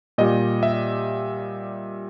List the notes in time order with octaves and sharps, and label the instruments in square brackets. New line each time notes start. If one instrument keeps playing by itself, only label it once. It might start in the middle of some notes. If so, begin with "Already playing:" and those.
[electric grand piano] A#2 G3 D#5
E5